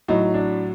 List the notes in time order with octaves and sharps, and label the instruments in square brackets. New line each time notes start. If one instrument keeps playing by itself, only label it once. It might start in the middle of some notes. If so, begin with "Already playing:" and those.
[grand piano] A2 F#3 D#4
D4